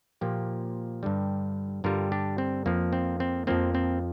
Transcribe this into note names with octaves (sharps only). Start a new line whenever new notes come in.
A#2 F3 A#3 G4 C5
G2 D3 G3
G2 D3 G3 F4 A#4
D4 G4
C4
F2 F3 A#3
C4
C4
F2 F3 A#3 C4
C4